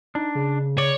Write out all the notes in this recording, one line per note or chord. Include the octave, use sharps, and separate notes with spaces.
D4 D#4
C#3
C#5 D5